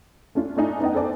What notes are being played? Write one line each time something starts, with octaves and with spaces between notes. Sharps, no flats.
A3 C#4 D4 F4
A3 D4 D#4 G#5
B3 D#4 D#5 G5
A4 C5 D5 G#5